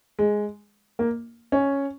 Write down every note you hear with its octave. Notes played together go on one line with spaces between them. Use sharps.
G#3
A#3
C#4